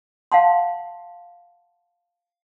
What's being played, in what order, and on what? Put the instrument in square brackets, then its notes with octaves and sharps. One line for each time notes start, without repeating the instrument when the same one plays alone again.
[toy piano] F5 F#5 A5 C6